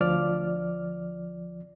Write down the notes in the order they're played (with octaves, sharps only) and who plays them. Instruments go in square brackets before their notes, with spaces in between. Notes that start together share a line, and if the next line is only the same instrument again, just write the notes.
[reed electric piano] D2 F3 D5 F6